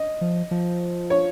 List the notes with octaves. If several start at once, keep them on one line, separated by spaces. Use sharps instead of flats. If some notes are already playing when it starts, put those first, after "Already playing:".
Already playing: D#5
F3
F3
C#5